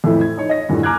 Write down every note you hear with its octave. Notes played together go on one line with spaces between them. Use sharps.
F2 A2 E3 A3
G#6
D#4 C#5
D#5 A#6
E2 G2 A#2 E3 G3 A3
G#5 A#5 D6 F6 F#6 G#6